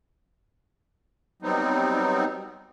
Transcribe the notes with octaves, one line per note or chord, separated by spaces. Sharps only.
F#3 G3 B3 C4 D#4